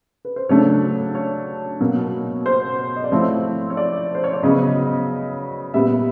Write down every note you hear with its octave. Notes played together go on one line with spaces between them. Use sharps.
B4
C5
C#3 F#3 A3 D4 C#5
C#5
B2 F#3 A#3
C5
D#5
D5
F3 A3 C4 E4 C#5
C#5
D5
C5
C#5
D5
C#3 F#3 B3 D#5
A#2 G3 B3 E5